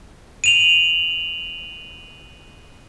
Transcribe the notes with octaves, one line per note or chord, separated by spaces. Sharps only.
D#7 F7 F#7